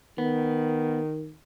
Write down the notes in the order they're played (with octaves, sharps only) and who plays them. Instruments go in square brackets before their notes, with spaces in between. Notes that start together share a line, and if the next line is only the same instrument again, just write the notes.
[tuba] D#3 [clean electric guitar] B3